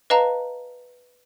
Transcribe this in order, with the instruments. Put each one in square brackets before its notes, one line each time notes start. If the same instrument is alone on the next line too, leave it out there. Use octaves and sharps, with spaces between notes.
[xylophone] B4 D#5 F5 A5 A#5